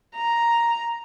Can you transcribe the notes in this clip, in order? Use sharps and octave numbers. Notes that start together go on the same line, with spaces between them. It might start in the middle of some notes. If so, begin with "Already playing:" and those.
A#5